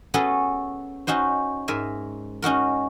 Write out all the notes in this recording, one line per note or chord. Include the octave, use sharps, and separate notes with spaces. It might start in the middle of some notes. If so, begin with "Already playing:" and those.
B3 C#4 F#4 G#4 A4 B4
C#4 D#4 F#4 C5
G#2 A#4 E5 G#5
C#4 D#4 F#4 A#4